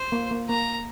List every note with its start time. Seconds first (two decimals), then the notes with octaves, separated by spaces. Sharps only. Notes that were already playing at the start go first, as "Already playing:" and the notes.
Already playing: C5
0.12 A#3
0.31 A#3
0.49 A#3 A#5